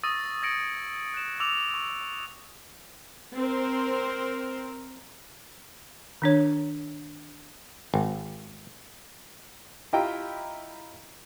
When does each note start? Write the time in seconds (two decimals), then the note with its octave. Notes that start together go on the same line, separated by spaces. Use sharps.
0.03 C#6 D#6 E6 A6 A#6 D#7
0.42 E6 G#6 A#6 C#7 D7 F#7
1.14 F#6 E7
1.40 D6 E6 F7
1.74 C#6
3.37 C4 A#4 C5
6.22 D#3 D4 C#5
7.94 G#1
9.93 E4 F4 G4 D#5 G5 A#5